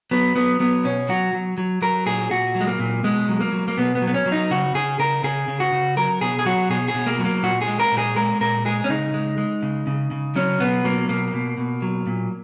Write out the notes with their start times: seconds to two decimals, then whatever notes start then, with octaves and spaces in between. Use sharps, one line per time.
0.11 F#3 B3
0.36 F#3 B3
0.60 F#3 B3
0.84 B2 C#4
1.09 F#3 F#4
1.33 F#3
1.58 F#3
1.82 F#3 A#4
2.06 A#2 G#4
2.31 A#2 F#4
2.55 F#3
2.61 G#3
2.68 A#3
2.80 A#2
3.04 B2 G#3
3.29 F#3
3.40 A#3
3.53 F#3
3.68 A#3
3.77 B2 B3
3.95 B3
4.02 F#3
4.07 B3
4.14 C#4
4.26 F#3
4.32 D#4
4.51 C#3 F#4
4.74 C#3 G#4
4.99 C#3 A#4
5.23 C#3 G#4
5.48 C#3
5.60 F#4
5.72 C#3
5.97 F#3 A#4
6.21 B2 G#4
6.39 G#4
6.46 F#3 F#4
6.70 B2 G#4
6.88 G#4
6.94 B2
7.07 A#3
7.19 F#3
7.25 A#3
7.43 A#2 F#4
7.62 G#4
7.68 G#3
7.80 A#4
7.92 A#2
7.98 G#4
8.16 G#3 A#4
8.41 A#2 A#4
8.65 G#3 G#4
8.84 C#4
8.89 C#3 D#4
9.14 G#3
9.38 G#3
9.63 C#3
9.87 C#3
10.11 C#3
10.36 F#3 C#4
10.60 B2 B3
10.84 F#3 A#3
11.09 B2 A#3
11.34 B2
11.58 B2
11.82 F#3
12.07 A#2